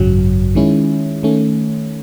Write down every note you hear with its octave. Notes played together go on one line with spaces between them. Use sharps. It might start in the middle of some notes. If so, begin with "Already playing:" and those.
Already playing: G#1 F#2 C#3 F#3
D#3 G#3 C#4 E4
D#3 A3 C#4